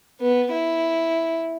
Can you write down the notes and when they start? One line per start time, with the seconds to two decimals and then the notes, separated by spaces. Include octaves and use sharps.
0.21 B3
0.51 E4